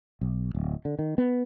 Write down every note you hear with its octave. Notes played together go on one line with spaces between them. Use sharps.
B1
D1
D3
D#3
B3